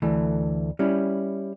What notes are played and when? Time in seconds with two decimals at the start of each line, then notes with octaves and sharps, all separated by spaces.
0.02 D2 E3 A3
0.79 G3 C#4 E4